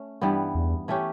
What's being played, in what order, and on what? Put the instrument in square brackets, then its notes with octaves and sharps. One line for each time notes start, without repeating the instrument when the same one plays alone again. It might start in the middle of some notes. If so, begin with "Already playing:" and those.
Already playing: [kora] A3 C#4
G2 E3 G3 B3
[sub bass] E2
[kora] E3 A3 C#4 G4